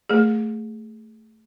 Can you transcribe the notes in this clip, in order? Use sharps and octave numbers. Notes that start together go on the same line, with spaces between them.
A3 G#4